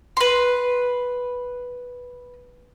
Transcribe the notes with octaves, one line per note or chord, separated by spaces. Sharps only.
B4 C6